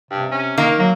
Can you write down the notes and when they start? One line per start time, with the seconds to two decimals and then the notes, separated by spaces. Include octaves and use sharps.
0.11 G2 C3
0.31 C#4
0.58 D#3 A#3
0.79 F#3 A#3